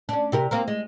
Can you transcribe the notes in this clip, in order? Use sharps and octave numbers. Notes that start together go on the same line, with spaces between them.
C#4 D4
C3 G4 A#4
A#3 C4 A#4
G#3